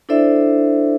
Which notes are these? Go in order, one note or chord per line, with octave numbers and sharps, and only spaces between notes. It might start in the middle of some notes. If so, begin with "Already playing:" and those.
D4 E4 A4 C5 D5 E5